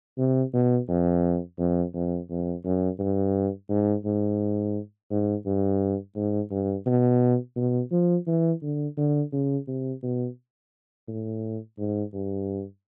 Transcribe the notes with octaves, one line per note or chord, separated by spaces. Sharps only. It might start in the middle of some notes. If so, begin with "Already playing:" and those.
C3
B2
F2
F2
F2
F2
F#2
G2
G#2
G#2
G#2
G2
G#2
G2
B2
B2
F3
E3
D3
D3
C#3
C3
B2
A2
G#2
G2